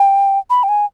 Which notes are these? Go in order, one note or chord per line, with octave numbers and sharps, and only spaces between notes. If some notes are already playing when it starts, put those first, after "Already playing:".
Already playing: G5
B5
G5
G#5